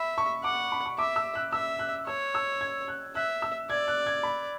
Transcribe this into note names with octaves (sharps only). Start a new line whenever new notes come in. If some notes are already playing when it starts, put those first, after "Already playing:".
Already playing: E5 B5
C#6
F#5 D6
B5
C#6
E5 D6
E6
F#6
E5 E6
F#6
C#5 E6
E6
G#6
F#6
E5 F#6
E6
D5 G#6
F#6
G#6
B5